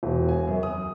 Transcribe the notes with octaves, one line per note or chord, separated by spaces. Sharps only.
E1
G#5
F#2
D#6